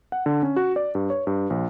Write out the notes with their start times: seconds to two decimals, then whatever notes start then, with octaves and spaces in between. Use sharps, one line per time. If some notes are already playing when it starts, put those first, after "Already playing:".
0.12 F#5
0.26 D3
0.43 C#4
0.56 F#4
0.76 D5
0.95 G2
1.10 C#5
1.27 G2
1.50 A#1